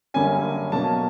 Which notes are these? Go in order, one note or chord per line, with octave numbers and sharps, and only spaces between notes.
F#2 D3 G3 A#3 C#4 G#5
B2 F#3 A#3 C#4 A5